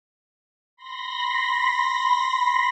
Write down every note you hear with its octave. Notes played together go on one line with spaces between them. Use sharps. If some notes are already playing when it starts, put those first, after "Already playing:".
B5 C6 A#6